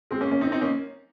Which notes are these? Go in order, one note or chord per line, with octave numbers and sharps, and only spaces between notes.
G#3 C4
A#3 C#4
A#3 C#4
C4 D#4
C4 D#4
A#3 C#4